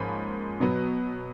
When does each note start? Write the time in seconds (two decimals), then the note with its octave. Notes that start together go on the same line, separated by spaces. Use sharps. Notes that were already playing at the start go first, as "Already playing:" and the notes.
Already playing: G#2 F3 A#3 C#4 B5
0.60 B2 F#3 B3